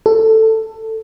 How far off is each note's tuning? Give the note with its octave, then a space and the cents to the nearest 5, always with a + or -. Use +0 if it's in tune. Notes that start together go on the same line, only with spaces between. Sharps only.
A4 +15